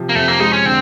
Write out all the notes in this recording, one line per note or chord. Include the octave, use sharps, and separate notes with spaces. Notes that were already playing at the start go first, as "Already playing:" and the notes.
Already playing: C3 F3
A#3
F2 A3
A#3
G#3 D#4
C#4
D3 C4